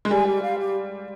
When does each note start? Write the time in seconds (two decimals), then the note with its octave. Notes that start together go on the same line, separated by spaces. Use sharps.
0.05 G#3
0.11 G3 G#5
0.27 G4
0.43 F5
0.59 G4